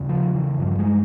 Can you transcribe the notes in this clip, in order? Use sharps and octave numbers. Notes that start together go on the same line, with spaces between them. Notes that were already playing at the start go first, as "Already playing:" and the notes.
Already playing: E2 C#3
F3
E3
G2 F3
G#3